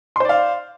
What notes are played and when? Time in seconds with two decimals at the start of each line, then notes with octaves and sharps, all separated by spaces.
0.16 C6
0.20 C5
0.25 D5
0.29 F5